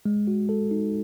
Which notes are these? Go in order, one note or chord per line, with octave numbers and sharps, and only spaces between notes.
G#3
F#4
A4
D#4